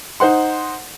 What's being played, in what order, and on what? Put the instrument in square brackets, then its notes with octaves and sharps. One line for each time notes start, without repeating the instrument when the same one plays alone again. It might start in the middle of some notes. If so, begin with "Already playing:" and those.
[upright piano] D#4 C5 F#5 C6